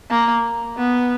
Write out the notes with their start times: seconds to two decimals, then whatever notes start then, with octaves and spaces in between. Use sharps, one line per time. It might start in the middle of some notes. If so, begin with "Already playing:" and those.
0.11 A#3
0.77 B3